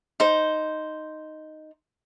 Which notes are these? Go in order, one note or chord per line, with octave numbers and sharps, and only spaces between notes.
D#4 C5